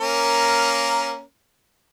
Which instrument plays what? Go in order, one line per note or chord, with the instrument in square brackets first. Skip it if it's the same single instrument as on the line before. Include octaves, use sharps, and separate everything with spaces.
[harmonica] A#3 C#4 A#4